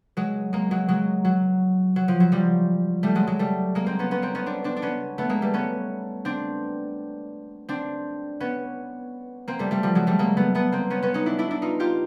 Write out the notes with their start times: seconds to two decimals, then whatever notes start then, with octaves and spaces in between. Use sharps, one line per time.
0.17 F#3 G#3
0.53 G#3 A#3
0.71 F#3 G#3
0.88 F#3 G#3
1.25 F#3
1.96 F#3
2.08 F3
2.20 F#3
2.32 F3 G3
3.03 G3 A3
3.15 F#3 G#3
3.27 F#3 G#3
3.39 G3 A3
3.75 G#3 A#3
3.86 A#3 C4
3.99 B3 C#4
4.11 B3 C#4
4.22 A#3 C4
4.35 B3 C#4
4.46 C4 D4
4.64 C4 D4
4.76 D4
4.82 B3 C#4
5.18 A3 B3
5.29 G#3 A#3
5.42 G3 A3
5.54 B3 C#4
6.25 C4 D4
7.69 C4 D4
8.40 B3 C#4
9.48 A#3 C4
9.59 G3 A3
9.71 G3 A3
9.83 F3 G3
9.95 F#3 G#3
10.07 G3 A3
10.19 G#3 A#3
10.37 A3 B3
10.54 A3 B3
10.72 A#3 C4
10.90 B3 C#4
11.02 B3 C#4
11.14 C#4 D#4
11.26 D4 E4
11.39 D4 E4
11.51 D4 E4
11.62 D#4 F4
11.80 F4 G4